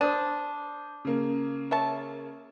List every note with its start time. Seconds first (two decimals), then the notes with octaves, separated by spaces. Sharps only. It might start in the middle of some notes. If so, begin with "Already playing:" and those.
0.01 D4 C5 D#6 D#7
1.05 C#3 A#3
1.71 C#5 E5 A5